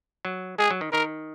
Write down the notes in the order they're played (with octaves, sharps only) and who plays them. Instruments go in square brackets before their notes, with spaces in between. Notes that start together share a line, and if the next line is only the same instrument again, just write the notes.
[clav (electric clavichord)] F#3
[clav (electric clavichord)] G#3 [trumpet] G#4
[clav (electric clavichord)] F#3
D#3
[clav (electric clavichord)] D#3 [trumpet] A#4